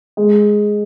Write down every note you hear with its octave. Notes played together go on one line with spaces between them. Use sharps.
G#3